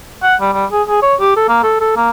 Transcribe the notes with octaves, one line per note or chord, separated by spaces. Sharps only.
F#5
G3
G3
G#4
G#4
C#5
G4
A4
A#3
A4
A4
A#3